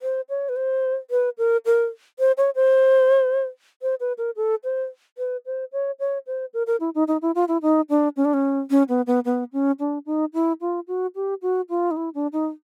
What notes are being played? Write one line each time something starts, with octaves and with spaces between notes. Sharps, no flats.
C5
C#5
B4
C5
B4
A#4
A#4
C5
C#5
C5
C5
B4
A#4
A4
C5
B4
C5
C#5
C#5
C5
A#4
A#4
E4
D#4
D#4
E4
F4
E4
D#4
D4
C#4
D4
C#4
C#4
B3
B3
B3
C#4
D4
D#4
E4
F4
F#4
G4
F#4
F4
D#4
E4
D4
D#4